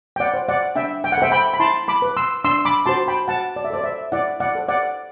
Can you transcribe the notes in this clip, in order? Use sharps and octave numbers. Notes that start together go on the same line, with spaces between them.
G5
D5 F#5
C5
D5 F#5
D4 E5 G5
G5
F#5
A4 C5 E5 G5
G5 B5
B5
E4 A5 C6
B5 D6
B4
C6 E6
D4 C6 E6
B5 D6
F#4 C5 A5 C6
G5 B5
F#4 F#5 A5
D5
E5
A4 C5 D5
E5
E4 D5 F#5
D5 F#5
A4 C5
D5 F#5